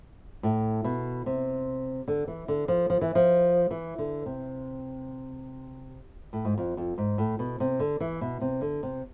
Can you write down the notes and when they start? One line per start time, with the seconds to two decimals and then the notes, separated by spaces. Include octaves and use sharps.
0.43 A2
0.84 B2
1.26 C3
2.08 D3
2.28 E3
2.48 D3
2.68 F3
2.90 F3
3.01 E3
3.15 F3
3.71 E3
3.98 D3
4.26 C3
6.33 A2
6.45 G#2
6.58 F2
6.77 F2
6.98 G#2
7.18 A2
7.39 B2
7.60 C3
7.80 D3
8.00 E3
8.21 B2
8.41 C3
8.61 D3
8.83 C3